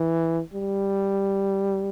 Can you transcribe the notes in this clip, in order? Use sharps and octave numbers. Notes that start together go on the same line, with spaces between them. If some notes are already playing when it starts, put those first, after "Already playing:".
Already playing: E3
G3